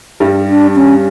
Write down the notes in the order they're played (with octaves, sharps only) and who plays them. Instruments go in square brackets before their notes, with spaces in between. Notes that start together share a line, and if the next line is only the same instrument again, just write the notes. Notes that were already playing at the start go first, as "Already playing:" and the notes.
[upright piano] G2 G3
[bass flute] D4
C#4